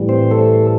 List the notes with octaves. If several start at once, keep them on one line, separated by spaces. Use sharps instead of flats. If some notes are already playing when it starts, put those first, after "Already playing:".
Already playing: A2 E3 G3
C4 C5
A3 A4